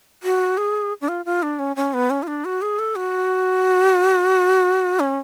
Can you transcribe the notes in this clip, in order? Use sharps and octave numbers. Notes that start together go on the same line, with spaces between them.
F#4
G#4
D4
F4
F4
D4
C#4
C#4
B3
C#4
F4
D4
F#4
G#4
A4
F#4
C#4